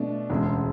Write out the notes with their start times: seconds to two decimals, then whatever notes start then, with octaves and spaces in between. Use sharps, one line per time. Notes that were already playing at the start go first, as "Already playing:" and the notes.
Already playing: B2 A3 D4
0.30 E1 D2 C#3 G#3